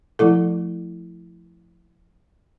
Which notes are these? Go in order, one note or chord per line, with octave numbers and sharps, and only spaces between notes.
F3 A3 E4 A4